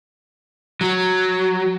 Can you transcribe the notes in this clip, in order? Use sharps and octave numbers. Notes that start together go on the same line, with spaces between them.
F#3